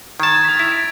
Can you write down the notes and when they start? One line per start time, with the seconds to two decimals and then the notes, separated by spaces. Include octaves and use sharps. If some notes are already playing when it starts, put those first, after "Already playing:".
0.20 D#3 A5 G#6 A6
0.45 B6 F7
0.59 E4 B6
0.72 D7